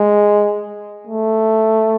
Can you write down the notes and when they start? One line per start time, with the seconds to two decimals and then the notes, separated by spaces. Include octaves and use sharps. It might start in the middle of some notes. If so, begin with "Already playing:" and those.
Already playing: G#3
1.07 A3